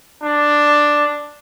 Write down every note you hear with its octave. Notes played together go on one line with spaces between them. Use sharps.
D4